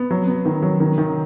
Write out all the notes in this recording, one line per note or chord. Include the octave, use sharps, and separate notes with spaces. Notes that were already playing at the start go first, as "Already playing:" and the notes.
Already playing: B3
F#3
B3
D#3
F#3
D#3
D#3